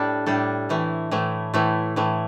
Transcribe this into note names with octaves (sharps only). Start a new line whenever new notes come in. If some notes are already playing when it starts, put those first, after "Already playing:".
Already playing: A2 G3 D4 A4
A2 G3 D4 A4
A2 E3 A3
A2 E3 A3
A2 E3 A3
A2 E3 A3